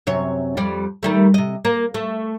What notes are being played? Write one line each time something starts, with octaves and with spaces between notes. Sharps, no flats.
F#2 C3 C#5
F2 G3 D5
D#3 G3 A3
C3 D#5
A#3
A3